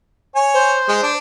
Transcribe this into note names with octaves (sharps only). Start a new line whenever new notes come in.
C#5 G#5
C5
G#3
D4